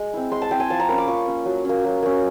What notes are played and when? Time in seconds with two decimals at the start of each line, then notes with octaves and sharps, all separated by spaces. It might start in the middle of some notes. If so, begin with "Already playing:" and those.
Already playing: G#3
0.13 C4 E4
0.32 G#3 C6
0.42 A5
0.51 C4 E4 G5
0.60 G#5
0.70 F3 A5
0.80 A#5
0.89 A#3 C#4 B5
0.98 D6
1.08 F3 C#6
1.26 A#3 C#4
1.45 F#3
1.65 A#3 C#4
1.85 F#3
2.03 A#3 C#4